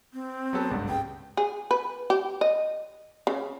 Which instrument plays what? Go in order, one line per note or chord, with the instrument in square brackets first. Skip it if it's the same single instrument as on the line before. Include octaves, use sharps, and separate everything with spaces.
[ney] C4
[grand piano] F#3 B3 A4
G#1 C#2 G2
[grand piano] C#3 [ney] G5
[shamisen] G#4
B4
G4
D#5
C#3